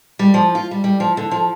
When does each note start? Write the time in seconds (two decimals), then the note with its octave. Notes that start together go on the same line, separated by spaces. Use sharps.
0.19 G3
0.34 F3
0.55 F4
0.71 G3
0.84 G3
1.00 F3
1.17 D3
1.31 F3